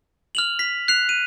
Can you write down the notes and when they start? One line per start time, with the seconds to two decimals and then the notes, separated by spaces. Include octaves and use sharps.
0.35 F6 F7 F#7
0.59 B6
0.88 F#6 C7 F7
1.09 D#7